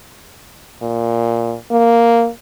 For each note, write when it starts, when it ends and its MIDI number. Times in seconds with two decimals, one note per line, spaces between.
0.82 1.55 46
1.71 2.29 58